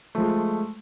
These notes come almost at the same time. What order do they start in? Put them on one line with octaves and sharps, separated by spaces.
A3 F3 G#3